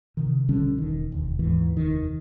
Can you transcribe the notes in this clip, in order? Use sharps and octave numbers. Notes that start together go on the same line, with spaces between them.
C3 D#3
B1 D3 G3 C#4
E1 D#3
E1 D2
D#2 G#2 E3
F1 D#2 D#3